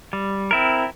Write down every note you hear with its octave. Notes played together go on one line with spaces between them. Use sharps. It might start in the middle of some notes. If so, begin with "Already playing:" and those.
G3
C4 E4 A#4